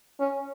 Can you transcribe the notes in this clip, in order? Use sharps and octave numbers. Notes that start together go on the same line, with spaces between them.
C#4